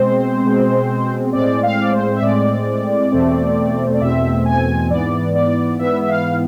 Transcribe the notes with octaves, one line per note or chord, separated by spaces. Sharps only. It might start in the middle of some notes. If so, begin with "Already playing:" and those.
Already playing: B2 G#3 C4 C5
B2 G#3 C4
A2 G#3 C4 D5
F5
D5
C5
E5
A2 G#3 C4 D5
E2 B2 A3 C4
D5
E2 B2 A3 C4 E5
G#5
G#2 E3 B3 D5
D5
G#2 E3 B3 E5
E5
F5